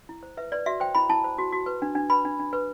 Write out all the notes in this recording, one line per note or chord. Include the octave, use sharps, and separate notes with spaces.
E4
C5
B4 E5
B4 D5
F#4 E5
C5 G5
E4 B5
E4 A5
C5
F#4
F#4
B4
D4
D4
B4 B5
D4
D4
B4